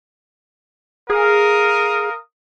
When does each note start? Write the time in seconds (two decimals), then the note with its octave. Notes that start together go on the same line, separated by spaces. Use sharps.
1.10 G#4 A#4 F5 D#6